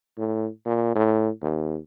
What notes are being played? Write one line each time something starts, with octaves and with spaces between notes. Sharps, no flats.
A2
A#2
A2
D#2